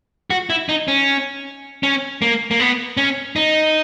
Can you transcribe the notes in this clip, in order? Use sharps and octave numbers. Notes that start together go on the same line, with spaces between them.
F#4
E4
D#4
C#4
C#4
A#3
A#3
B3
C#4
D#4